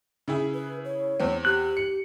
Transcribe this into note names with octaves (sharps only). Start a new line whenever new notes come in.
C#3 E4 G#4
B4
C#5
E2 C4
G4 F#6
C#7